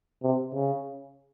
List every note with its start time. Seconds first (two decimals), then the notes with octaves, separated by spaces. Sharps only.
0.23 C3
0.54 C#3